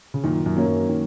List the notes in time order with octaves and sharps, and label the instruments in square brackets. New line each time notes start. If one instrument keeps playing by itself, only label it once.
[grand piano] C#3
[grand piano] F#2 A#2 [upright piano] D#3
[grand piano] F#2 A#2
[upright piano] F#3 A#3 C#4
[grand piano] F#2
[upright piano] D#3